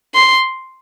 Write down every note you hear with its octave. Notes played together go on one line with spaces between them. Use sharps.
C6